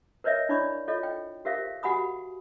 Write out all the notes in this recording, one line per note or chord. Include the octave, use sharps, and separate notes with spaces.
A#4 B4 C#5 D#5 E5
D4 E4 C#5 D5 B5 C#6
F4 A4 C#5 D#5
G5
G4 A4 A#4 C5 E5 F5
F#4 G4 F#5 G#5 B5 D#6